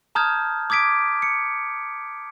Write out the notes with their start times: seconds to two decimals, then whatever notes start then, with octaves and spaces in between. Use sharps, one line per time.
0.15 A5 A#5 D#6 F6 G6 G#6
0.70 D6 D#6 G#6 B6 D7
1.22 C#7